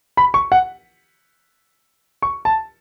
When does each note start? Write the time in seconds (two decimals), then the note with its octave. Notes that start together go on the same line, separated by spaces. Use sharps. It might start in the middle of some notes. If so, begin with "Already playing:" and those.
0.17 B5
0.34 C#6
0.52 F#5
2.22 C#6
2.45 A5